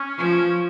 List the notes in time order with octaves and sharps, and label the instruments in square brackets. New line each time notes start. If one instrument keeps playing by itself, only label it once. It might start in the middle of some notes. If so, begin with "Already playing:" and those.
Already playing: [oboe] C#4
[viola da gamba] F3